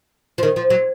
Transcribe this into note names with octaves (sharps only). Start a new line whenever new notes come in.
F3
D#3
F3
F#3